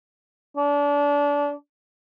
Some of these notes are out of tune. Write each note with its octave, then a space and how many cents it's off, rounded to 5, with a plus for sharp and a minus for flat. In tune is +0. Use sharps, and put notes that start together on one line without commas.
D4 -30